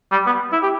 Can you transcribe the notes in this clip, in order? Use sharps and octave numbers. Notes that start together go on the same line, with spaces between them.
G3
B3
E4
G4